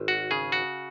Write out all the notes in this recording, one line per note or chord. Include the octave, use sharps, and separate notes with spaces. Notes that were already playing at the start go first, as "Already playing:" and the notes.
Already playing: G#1
F#4
C#3 G#4
F#4